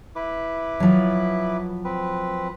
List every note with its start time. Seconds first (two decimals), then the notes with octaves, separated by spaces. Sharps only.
0.16 E4 B4 D6
0.80 F3 F#3
1.85 C4 B4